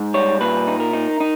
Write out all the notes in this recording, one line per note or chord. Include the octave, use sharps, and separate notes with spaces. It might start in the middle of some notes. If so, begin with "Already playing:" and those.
Already playing: G#2
G3 C#5
A#2 B4
D#4
A#4
D#4
D#4